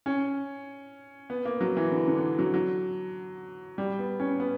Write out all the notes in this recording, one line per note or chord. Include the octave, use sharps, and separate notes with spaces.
C#4
B3
A#3
F#3
E3
D3
D3
F#3
F#3
G3
B3
C#4
B3